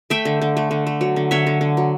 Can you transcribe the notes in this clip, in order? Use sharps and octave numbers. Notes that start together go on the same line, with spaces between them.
A3 E5 G5
D3
D3
A3
D3
A3
F#3
D3
D3 C#5 E5
D3
D3
F#3